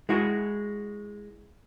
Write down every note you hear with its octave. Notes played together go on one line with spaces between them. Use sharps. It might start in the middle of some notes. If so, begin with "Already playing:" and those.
G#3 E4 F#4